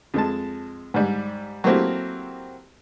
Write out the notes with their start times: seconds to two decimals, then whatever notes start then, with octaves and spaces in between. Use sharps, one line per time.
0.14 F2 G#3 A5
0.94 G#2 G3
1.64 F#3 A3 A#3 C4 E4 G4